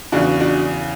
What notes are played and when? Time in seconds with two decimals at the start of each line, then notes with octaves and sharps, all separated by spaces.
0.12 E2 C#3 E3 D4 F#4
0.40 D4 F#4